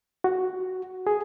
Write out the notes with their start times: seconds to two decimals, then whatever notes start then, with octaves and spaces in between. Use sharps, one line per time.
0.24 F#4
1.07 G#4